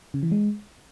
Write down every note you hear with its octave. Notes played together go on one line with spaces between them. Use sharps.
C#3
E3
G#3